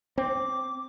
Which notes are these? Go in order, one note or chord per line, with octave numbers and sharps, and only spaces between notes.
C4 D6